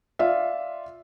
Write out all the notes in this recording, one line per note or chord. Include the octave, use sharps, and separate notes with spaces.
F4 D5 E5 F5